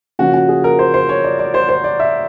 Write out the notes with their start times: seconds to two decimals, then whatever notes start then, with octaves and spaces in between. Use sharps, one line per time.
0.19 C#3 F3 A#3 C#4 F#4
0.34 F#4
0.49 G#4
0.64 A#4
0.79 C5
0.94 C5
1.09 C#5
1.24 D5
1.39 D5
1.54 C5
1.69 C5
1.84 D5
2.00 E5